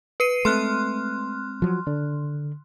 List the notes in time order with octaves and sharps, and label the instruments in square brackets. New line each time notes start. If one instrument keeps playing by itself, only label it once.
[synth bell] B4 C7 D#7
[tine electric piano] G#3 C4 [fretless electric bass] A3 [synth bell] C6 F6 F#6
[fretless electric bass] F3 F#3
[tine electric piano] D3 [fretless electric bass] D4